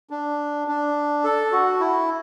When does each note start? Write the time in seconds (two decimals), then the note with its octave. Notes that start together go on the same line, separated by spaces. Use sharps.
0.10 D4
0.68 D4
1.24 A4
1.52 F#4
1.80 E4